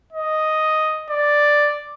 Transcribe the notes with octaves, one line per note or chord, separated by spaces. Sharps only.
D#5
D5